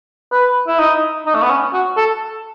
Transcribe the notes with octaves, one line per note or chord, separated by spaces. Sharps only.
B4
E4
D#4
D#4
A3
B3
C#4
F#4
A4